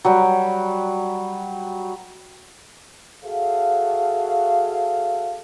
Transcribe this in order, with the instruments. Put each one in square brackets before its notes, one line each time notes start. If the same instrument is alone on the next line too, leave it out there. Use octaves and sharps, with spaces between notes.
[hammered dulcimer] F#3 G3 G5
[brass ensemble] F#4 G#4 A4 C#5 E5 F5